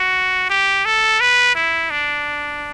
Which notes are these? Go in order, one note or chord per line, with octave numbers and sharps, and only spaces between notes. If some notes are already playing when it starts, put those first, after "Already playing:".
Already playing: F#4
G4
A4
B4
E4
D4